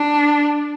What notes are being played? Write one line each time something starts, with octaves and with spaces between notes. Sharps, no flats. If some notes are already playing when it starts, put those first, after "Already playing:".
Already playing: D4